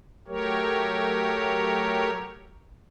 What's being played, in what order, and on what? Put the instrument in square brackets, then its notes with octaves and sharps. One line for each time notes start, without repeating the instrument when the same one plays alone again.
[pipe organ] F#3 A3 G4 A#4 C#5